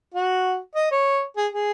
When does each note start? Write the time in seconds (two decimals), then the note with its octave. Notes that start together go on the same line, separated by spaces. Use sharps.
0.14 F#4
0.75 D#5
0.91 C#5
1.37 G#4
1.52 G#4